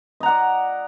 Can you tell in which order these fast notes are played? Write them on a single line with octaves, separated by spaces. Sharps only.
D#5 A#5 F#5 D5